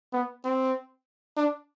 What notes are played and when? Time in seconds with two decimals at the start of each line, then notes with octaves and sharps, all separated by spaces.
0.13 B3
0.45 C4
1.37 D4